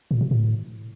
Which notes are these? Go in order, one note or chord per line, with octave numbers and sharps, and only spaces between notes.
A#2
B2
A2